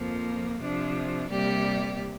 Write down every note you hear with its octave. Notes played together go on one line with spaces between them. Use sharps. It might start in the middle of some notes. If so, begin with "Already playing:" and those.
Already playing: F2 F3 A#3
C3 F3 D4
C3 G3 A#3 G4 D5